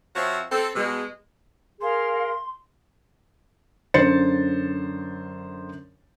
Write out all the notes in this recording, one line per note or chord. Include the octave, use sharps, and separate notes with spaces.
F3 C4 F#4 C#5 E5
C4 A4
B2 G#3
G#4 A#4 F5 C6
F#2 D3 C5 A6 C#7